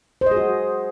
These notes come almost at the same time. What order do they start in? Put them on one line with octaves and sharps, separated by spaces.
C5 D#5 G#4 F#4